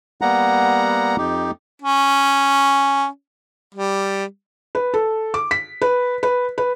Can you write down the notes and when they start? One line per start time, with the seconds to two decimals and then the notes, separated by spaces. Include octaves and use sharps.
0.21 G3 A#3 B3 F#5 A#5
1.18 F2 D#4 G4
1.82 C#4
3.74 G3
4.75 B4
4.94 A4
5.34 D6
5.51 B6
5.82 B4
6.23 B4
6.58 B4